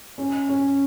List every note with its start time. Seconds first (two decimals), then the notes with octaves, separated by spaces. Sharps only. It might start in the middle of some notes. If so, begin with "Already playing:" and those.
0.18 C#4
0.49 C#4